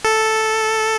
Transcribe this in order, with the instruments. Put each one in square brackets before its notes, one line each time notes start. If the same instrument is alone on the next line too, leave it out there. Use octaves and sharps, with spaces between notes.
[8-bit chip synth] A4